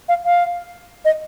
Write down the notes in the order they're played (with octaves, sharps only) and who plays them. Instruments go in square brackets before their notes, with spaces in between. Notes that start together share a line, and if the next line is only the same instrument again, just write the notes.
[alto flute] F5
F5
D#5